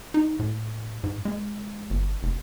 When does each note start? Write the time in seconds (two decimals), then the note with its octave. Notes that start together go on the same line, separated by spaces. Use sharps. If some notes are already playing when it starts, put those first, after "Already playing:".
0.14 D#4
0.39 A2
1.04 G#2
1.25 G#3
1.90 G1
2.23 F1